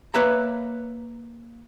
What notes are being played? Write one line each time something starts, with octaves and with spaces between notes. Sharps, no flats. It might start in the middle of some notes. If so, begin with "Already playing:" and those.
A#3 B4 C#5 E5 A#5